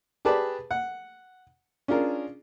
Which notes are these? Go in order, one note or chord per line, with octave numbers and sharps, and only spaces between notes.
G4 G#4 B4 D5 A5
F#5
C#4 D4 F4 G#4 A#4